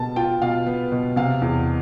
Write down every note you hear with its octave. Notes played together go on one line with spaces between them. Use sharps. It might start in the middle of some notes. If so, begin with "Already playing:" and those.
Already playing: B2 B3 A5
F4 G5
B2 F5
B3
B2
C3 F5
E2